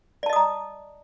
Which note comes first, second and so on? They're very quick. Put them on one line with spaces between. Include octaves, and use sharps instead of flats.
D5 A5 D#5 D#6 A#5